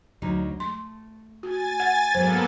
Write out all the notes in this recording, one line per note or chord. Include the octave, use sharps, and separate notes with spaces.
D2 F#3 D#4
A3 C6
F#4 G#5 A6
F#5
G#2 F#3 A#3 B3 A4 C5